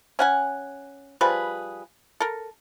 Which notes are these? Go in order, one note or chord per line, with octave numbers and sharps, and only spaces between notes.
C#4 F#5 G#5
F3 G3 G#4 B4
A4 A#4